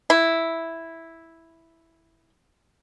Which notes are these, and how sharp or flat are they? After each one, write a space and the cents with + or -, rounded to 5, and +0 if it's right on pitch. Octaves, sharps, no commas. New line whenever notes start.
E4 +0